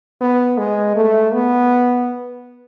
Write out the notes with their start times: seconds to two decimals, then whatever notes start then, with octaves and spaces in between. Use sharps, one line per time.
0.21 B3
0.58 G#3
0.96 A3
1.33 B3